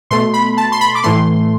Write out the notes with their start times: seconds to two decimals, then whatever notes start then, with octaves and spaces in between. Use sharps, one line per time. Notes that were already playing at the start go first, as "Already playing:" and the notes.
0.11 B2 A3 C6
0.33 B5
0.57 A5
0.72 C6
0.81 B5
0.95 D6
1.03 A2 E3 A3 C6